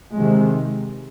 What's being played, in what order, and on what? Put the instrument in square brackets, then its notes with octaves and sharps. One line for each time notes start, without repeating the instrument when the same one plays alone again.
[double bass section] C3 D#3 G#3